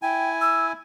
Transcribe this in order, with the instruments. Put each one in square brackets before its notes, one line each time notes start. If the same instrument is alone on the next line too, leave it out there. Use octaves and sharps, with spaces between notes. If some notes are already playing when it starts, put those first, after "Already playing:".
[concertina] E4 G#5 [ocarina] G5
[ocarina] E6